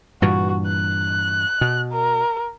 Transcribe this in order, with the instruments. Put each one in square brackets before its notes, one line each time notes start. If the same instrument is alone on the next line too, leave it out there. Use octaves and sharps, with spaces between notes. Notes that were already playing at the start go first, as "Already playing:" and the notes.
[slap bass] G2 A#2 E3 [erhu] F#4
[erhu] F#6
[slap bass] B2
[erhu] A#4